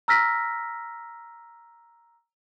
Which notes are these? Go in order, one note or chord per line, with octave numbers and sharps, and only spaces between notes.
A#5 E6 F6 A#6 B6